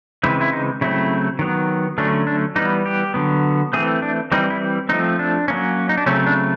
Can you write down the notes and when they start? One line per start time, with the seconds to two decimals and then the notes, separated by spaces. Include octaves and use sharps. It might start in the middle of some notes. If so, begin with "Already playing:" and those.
0.23 C#3 E3 G#3 C4 E4
0.41 E4
0.53 D#4
0.81 C#3 F#3 A3 C4 E4
1.39 D#3 F#3 B3
1.98 D3 F#3 A3 C#4 D4
2.27 D4
2.56 E3 G3 B3 D#4
2.86 G4
3.14 D3 F#3 B3
3.73 E3 A3 C4 G#4
4.02 D4
4.32 E3 G3 C4 D#4
4.50 E4
4.89 F3 A3 C4 D#4
5.19 D4
5.48 F#3 A#3 C#4
5.89 D#4
5.97 D4
6.06 C#3 F#3 A3 C4 C#4
6.27 D4